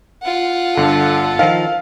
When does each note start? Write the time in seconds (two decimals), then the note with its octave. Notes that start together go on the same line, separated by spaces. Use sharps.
0.23 F4 F#5
0.77 G1 D3 A4
1.39 D#3 F3 F5